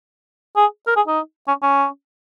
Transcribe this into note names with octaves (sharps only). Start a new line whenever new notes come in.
G#4
A#4
G#4
D#4
C#4
C#4